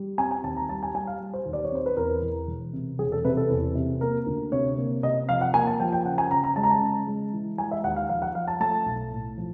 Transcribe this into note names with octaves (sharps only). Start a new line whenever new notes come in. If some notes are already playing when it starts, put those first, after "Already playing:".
Already playing: G3
C4 G#5
G#5
D#2 A5
A#5
G3 A5
G#5
G3 G#5
F5
G3
C5
D#2
D5
C#5
C4 C5
B4
E2 A#4
E2
E1
C3
E1 G#4
A4
C3 B4
A4
E2
C3
A#3 A#4
D2
C3 C#5
A#3
C3 D#5
F3 F5
F#5
A#3 G#5
A5
F3 G5
G5
C#3 F#5
G#5
C#3 A#5
A#5
G#3 A5
A#5
A5
C#3
G#3
E3
G#3 G#5
E5
D#2 F#5
F5
F3 F5
F#5
F3 F5
A5
A3 A5
B1
A2
F3